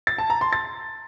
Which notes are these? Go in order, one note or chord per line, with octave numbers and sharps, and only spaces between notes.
A6
A5
A#5
C6
A6